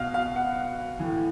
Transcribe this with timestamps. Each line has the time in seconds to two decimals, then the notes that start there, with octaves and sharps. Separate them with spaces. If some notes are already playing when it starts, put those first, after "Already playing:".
Already playing: B2 F5
0.14 F5
0.36 F#5
0.99 A2 E3